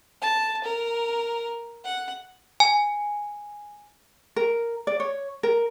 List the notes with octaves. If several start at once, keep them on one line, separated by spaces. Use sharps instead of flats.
A5
A#4
F#5
G#5
A#4
D5
C#5
A#4